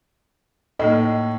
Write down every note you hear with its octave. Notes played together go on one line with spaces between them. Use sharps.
A2 A#3 D#4 A4 D#5